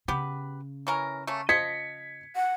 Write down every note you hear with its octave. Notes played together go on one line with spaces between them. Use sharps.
C#3 B3 G4 B4
E3 C#4 A#4
A3 A#3 C#4
F3 D#5 G#6 B6 C#7
F#5